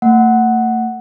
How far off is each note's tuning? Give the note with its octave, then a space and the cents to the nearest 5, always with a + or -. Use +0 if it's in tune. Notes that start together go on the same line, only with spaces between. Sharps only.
A3 +40 F#5 +0